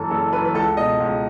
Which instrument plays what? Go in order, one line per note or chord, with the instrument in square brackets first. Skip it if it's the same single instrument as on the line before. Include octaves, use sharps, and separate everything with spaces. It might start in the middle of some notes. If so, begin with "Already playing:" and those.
Already playing: [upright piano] F#1 F#2 E3 A4
F#1 A4
F#2 E3 B4
B4
C#2 A4
B2 D#5
C#2